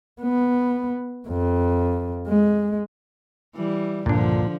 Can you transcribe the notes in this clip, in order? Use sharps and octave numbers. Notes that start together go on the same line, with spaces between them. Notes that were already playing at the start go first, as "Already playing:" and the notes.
B3
F2
G#3
E3 G3
C#2 G2 A#2 D3 F3 A#3 D4